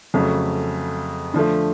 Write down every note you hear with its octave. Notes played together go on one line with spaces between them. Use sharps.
F2 C#3 F#3 A3
D3 F3 A3